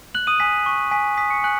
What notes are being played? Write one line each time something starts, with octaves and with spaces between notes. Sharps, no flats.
F#6 F#7
D#6 D#7
G#5 B6
C#6
G#5 B6
D#6 B6
C#6 C#7
G#5 F#6 F#7